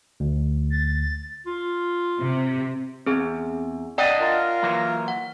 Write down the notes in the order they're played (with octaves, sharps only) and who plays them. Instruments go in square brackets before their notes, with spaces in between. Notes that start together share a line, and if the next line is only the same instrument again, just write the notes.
[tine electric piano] D2
[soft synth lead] A6
[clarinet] F4
[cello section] C3
[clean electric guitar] E2 [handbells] C4 G#4
[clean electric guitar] D4 D#5 [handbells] D5 F#5 G5
[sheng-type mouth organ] F4 A#4
[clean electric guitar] E3 F#3 A#3
[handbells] F#5